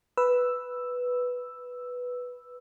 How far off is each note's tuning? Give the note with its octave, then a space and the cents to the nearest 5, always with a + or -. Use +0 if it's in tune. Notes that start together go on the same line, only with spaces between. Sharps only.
B4 +0 E6 +0